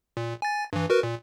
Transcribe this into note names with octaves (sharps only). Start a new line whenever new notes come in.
A#2
G#5 A6
G2 E3
F#4 A#4 B4
A#2